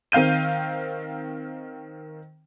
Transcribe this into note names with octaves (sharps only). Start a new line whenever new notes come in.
D#3 C4 F5 G6 D#7